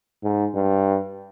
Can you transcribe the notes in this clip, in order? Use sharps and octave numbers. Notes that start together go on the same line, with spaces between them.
G#2
G2